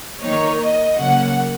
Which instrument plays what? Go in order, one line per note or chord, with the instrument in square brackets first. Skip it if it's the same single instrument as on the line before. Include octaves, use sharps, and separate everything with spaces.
[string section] D#3 A#3 D#4 [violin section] C#5
[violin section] D#5
[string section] C#3 F#3 A#3 [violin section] F#5